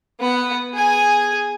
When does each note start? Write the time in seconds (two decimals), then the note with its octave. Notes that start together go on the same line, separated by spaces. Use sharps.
0.20 B3 F#5
0.74 G#4 G#5